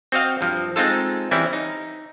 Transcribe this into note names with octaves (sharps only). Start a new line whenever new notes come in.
C4 F#4 D#5 F5 G5
G2 F3
G#3 C4 D#4 F4 A4
E3 G3 C4 C#4 E4
D#4